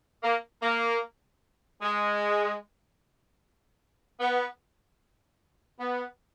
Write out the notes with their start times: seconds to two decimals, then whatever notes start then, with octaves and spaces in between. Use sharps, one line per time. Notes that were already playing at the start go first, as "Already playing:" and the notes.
0.23 A#3
0.62 A#3
1.82 G#3
4.20 B3
5.79 B3